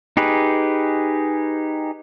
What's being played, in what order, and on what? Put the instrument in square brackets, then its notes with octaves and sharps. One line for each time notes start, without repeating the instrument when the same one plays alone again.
[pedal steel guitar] D#4 G4 G#4 B4